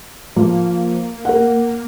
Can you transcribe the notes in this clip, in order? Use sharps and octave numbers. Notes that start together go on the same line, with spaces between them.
F3 A#3
A#4 F#5